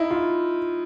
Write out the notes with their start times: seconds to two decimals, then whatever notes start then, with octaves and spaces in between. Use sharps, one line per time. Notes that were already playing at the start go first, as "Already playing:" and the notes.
Already playing: D#4 E4
0.10 F4